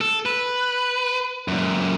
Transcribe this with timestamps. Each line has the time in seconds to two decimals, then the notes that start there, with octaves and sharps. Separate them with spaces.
0.01 A4
0.26 B4
1.48 F#2 A#2